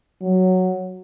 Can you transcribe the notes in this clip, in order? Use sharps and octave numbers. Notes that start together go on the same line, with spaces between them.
F#3